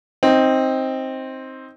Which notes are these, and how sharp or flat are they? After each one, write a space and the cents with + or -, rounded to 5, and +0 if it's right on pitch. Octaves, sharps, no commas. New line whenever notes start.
C4 +10 D#4 +10